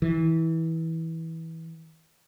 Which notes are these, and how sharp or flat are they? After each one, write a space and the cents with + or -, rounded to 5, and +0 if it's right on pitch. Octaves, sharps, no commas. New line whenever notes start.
E3 -20